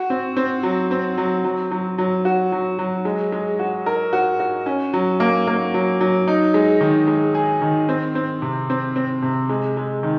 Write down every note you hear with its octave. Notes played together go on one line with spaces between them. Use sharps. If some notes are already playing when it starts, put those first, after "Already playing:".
Already playing: F#4
C4
C4
F#3
C4
F#3
F#3
F#3
F#3
F#4
F#3
F#3
G#3
G#3
F#4
A#4
F#4
F#4
C#4
F#3
A#3
A#3
F#3
F#3
D#4
G#3
D#3
G#3
G#4
D#3
C4
C4
C3
C4
C4
C3
G#3
G#3
D#3